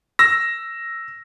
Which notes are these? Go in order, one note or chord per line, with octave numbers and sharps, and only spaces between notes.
E6 A#6